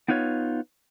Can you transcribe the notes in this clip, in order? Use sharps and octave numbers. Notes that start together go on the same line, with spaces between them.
B3 D#4 F4 B4 C#5